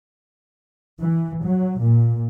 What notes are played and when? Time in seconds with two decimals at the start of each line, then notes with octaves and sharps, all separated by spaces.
1.00 E3
1.46 F#3
1.80 A#2